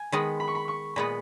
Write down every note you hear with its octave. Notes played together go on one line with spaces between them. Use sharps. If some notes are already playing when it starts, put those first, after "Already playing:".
Already playing: G#5
D#3 G#3 B3 B5
B5
C#6
B5
C#6
A#2 G#3 B3 B5